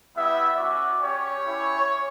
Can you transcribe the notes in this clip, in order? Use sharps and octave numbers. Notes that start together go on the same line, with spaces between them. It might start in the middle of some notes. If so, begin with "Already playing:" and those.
G3 B3 E4 E5
C#4 F#4 D5
C#4 G4 C#5
C#4 E4 G4